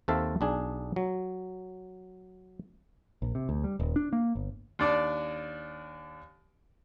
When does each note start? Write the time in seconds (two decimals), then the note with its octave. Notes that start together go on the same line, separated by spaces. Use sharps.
0.08 D#2 C4 A4 E5 F5
0.41 B1 D4 G#4
0.96 F#3
3.22 A#1
3.35 C3
3.49 D2
3.64 G3
3.80 D#1
3.96 D4
4.13 A#3
4.35 G1
4.79 D#2 D4 D5